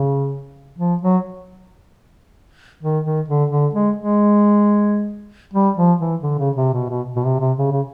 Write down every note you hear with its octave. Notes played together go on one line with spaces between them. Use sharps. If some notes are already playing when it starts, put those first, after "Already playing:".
Already playing: C#3
F3
F#3
D#3
D#3
D3
D3
G#3
G#3
G3
F3
E3
D3
C#3
C3
B2
B2
B2
C3
C3
C#3
C#3